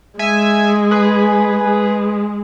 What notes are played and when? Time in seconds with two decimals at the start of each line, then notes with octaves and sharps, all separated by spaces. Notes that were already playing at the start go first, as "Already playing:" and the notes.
0.19 G#3 E5 G#5
0.91 G#4 B4
1.64 G#3